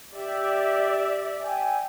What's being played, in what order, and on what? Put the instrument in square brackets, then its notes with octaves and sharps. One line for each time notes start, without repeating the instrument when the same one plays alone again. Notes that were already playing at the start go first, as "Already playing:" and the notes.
[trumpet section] G4 [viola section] D5 E5
[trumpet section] G5 G#5